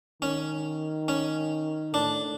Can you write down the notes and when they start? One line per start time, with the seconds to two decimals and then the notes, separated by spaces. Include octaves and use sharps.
0.22 D#3 C#4
1.08 C#4
1.94 A2 D4